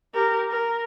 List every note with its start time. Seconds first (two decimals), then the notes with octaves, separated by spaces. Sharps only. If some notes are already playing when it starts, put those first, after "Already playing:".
0.14 G4 A#4
0.50 A#4